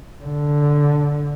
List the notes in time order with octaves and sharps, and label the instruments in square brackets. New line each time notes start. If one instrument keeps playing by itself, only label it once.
[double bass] D3